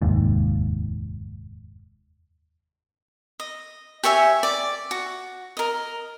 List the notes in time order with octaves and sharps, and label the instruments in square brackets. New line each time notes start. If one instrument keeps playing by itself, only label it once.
[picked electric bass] F1 D#2 G#2
[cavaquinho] D#5
G4 C#5 E5 G#5
D5
F#4
A#4 D#5